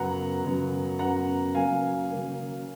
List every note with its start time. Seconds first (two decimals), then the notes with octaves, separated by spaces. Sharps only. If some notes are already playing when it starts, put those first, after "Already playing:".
Already playing: F#2 C#3 F#3 B3 F#5 A#5
0.44 F#2 C#3 F#3 B3
0.99 F#2 C#3 F#3 B3 F#5 A#5
1.55 C#3 F#3 A#3 C#4 F5 G#5
2.10 C#3 F#3 A#3 C#4